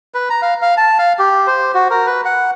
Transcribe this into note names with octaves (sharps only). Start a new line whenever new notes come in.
B4
A#5
F5
F5
A5
F5
G4
C5
F#4
A#4
B4
F#5